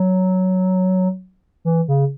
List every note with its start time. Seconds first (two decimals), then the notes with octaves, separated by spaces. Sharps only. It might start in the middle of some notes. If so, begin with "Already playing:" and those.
Already playing: F#3
1.65 E3
1.88 C#3